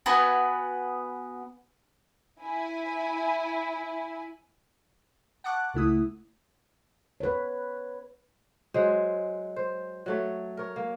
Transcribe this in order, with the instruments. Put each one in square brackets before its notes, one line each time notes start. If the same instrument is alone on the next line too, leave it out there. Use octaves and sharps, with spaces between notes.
[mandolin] B3 F#4 B4 G#5
[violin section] E4 G#5
[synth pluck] F#5 A5 C#6 D6 F#6
C#2 A3 E4 D#6
[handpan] B4 C#5
[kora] F#3 G#3 G#4 C5
C5
F#3 A3 C#5
A#4 C#5
A#3